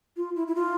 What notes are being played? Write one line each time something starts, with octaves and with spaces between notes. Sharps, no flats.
F4
E4
E4
F4